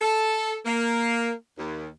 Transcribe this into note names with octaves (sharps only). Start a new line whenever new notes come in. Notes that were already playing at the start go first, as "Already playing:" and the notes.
A4
A#3
D#2